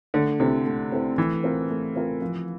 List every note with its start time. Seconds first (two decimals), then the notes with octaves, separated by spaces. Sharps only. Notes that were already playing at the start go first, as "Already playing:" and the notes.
0.14 D3 A3
0.40 C3 C4 E4 A4 C5
0.66 A3
0.92 C4 E4 A4 C5
1.18 E3 A3
1.44 C4 F4 A#4
1.70 A3
1.96 C4 F4 A#4
2.22 F3